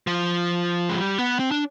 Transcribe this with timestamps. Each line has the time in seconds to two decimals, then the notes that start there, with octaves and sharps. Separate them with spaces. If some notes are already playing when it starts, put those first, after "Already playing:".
0.07 F3
0.89 G#3
0.96 G3
1.18 B3
1.39 C4
1.51 D4